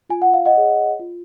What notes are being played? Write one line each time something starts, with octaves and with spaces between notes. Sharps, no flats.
F4 G#5
F#5
F5
D#5 F#5
G#4 C#5
F4